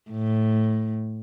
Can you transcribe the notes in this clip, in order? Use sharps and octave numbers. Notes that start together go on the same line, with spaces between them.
A2